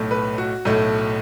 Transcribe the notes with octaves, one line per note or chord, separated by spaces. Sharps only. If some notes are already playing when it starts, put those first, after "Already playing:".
Already playing: B1 A2 A3
B4
F#4
B1 A2 A3